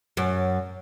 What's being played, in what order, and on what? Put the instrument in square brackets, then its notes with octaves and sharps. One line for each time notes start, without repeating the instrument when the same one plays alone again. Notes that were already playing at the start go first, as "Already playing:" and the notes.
[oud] F#2